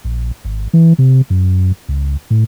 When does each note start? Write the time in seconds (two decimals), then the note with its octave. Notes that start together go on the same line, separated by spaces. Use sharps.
0.05 A#1
0.45 G#1
0.73 E3
0.99 C3
1.30 F#2
1.89 C#2
2.30 A2